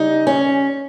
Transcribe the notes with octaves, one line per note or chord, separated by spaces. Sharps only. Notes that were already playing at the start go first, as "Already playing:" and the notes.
Already playing: C#3 G3 D#4
C#4